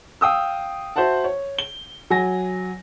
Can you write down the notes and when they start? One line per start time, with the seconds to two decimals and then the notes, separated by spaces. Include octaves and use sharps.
0.21 F5 G5 D#6 E6
0.96 F#4 C5 E5 F#5 A5
1.24 C#5
1.59 G7
2.10 F#3 G#5 A#6